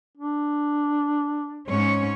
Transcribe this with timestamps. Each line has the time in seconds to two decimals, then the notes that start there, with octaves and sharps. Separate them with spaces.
0.17 D4
1.68 G#2 C#4 C#5